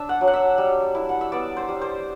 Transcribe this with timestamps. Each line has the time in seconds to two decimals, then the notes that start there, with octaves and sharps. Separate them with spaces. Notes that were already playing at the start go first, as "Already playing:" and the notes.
Already playing: D4 E5
0.09 F#5
0.21 F#3
0.28 F#5
0.33 E5
0.58 G3
0.95 E4
1.09 F#5
1.21 E5
1.32 B3 D5
1.57 C5
1.69 G3
1.81 C5